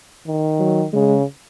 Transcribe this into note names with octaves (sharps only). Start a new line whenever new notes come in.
D#3
F#3
C#3 G#3